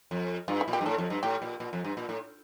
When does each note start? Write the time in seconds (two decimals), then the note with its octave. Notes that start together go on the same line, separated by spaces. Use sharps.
0.11 F2
0.48 G2 F4
0.61 E4
0.68 A#2
0.73 G4
0.81 G2
0.86 A2 A4
0.98 F2
1.10 G2
1.23 A2 G4
1.42 A#2
1.60 A#2
1.73 F2
1.84 G2
1.97 A#2
2.09 A2